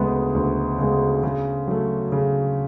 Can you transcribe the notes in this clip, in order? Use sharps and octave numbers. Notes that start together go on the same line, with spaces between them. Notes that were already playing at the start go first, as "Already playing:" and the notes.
Already playing: D2 C#3 G#3 B3
D2
C#3 G#3 B3
C#3
F#3 A3
C#3